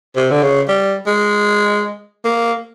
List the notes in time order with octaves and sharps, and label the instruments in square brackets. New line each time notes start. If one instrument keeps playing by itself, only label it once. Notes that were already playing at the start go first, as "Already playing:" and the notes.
[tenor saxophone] C3
D3
C#3
G3
G#3
A#3